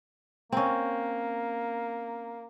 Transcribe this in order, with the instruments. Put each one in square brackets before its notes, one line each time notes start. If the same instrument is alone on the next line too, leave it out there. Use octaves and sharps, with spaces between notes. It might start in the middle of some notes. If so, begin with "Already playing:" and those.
[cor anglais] A#3 [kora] C4 C#4